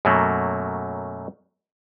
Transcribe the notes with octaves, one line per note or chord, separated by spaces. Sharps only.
F#2 B2 F#3 A3 A#3